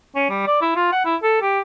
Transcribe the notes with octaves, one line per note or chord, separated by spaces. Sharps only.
C#4
G3
D5
E4
F4
F#5
E4
A4
G4